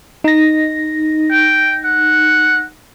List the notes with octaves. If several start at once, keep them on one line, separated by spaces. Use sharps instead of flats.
D#4 A#6
G5
F#5